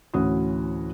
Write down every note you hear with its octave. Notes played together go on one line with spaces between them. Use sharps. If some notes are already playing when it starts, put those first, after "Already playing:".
D2 A2 E3 C#4 F#4 D#6